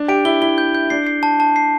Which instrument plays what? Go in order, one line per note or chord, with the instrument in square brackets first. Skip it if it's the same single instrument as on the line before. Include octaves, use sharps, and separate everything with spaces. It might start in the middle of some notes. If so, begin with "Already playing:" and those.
Already playing: [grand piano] D4
[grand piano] G4 [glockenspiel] D7
[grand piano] E4 [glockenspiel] G7
[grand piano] E4 [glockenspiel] G7
[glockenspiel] G6
G6
[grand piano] D4 [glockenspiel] C7
[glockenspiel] C7
A5
A5
C7